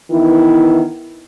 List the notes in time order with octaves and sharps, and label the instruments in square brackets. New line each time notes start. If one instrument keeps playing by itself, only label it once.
[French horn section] D#3 E3 B3 E4